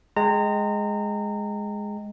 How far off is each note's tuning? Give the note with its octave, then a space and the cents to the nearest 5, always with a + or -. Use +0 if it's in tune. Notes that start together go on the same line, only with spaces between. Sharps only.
G#3 +0 G5 -5 A#5 -30